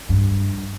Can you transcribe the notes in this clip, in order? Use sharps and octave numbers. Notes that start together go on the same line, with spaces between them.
G2